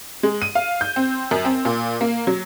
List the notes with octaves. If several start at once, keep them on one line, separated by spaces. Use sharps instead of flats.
G#3
D#7
F5
G6
C4
F#2
C4
A#2
A#3
F#3